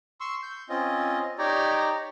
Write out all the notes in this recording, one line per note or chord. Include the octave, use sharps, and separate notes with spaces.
C6 C#6 E6
G6
C4 C#4 F4 D#5
D#4 G4 C#5 D5 A#5